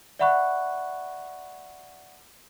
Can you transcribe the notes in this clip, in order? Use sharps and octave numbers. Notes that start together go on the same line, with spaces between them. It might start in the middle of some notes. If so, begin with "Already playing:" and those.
D5 E5 F#5 B5 C#6 F#6